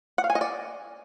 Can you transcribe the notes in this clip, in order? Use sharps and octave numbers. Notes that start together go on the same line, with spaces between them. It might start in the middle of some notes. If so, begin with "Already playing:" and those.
F#5
F5
G#5
D#5
D5